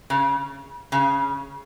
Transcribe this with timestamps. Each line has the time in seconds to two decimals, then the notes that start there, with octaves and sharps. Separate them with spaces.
0.10 C#3
0.92 C#3